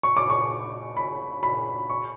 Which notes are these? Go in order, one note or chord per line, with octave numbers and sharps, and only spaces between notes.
C#6
D6
C#6
B5
B5
C#6